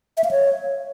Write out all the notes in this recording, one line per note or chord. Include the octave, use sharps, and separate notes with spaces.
E5
F5
C#5